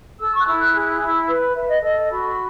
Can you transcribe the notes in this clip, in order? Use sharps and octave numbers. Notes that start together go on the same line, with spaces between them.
A4 E6
C#6
F#6
E4 E6
F#6
G#4 F#6
E4 E6
B4
B4 E5
D#5
A4 D#5
F#4 B5